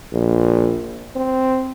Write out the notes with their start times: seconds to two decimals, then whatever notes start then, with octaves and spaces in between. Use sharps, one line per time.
0.12 A#1
1.16 C4